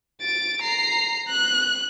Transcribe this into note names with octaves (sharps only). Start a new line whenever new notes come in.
A6 D7
A#5 C7
F#6